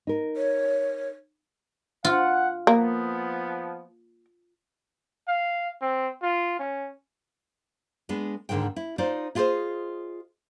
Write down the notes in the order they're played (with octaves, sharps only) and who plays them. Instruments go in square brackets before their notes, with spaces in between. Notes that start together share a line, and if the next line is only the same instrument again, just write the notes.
[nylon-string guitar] D#4 A#4
[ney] C#5
[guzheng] F4 [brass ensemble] F#5
[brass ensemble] F3 B3 [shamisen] A#3
[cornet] F5
C4
F4
C#4
[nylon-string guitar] G#3 B3 D4 B4
D2 G#2 D3 D#3 G#3 G5
E4
D#4 F4 C5 D5
E4 F4 G#4 A4 C5 D#5